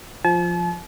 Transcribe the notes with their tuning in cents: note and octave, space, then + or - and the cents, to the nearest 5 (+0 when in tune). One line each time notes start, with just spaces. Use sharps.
F3 +0 A5 -40